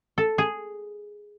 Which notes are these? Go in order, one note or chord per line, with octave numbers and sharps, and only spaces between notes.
A4
G#4